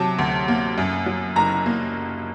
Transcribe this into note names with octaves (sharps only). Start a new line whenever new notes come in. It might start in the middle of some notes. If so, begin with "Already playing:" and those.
Already playing: C3 F#3 A5
D2
A#3
F#2
F#3
F#1 A#5
A#3